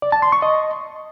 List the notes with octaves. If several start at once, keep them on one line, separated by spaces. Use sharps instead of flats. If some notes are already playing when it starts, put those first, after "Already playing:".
D5
A5
C6
C#6
D#5